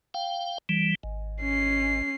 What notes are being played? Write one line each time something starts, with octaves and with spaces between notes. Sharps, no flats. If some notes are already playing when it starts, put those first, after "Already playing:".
F5 G5
E3 G3
G#1
C#4 C7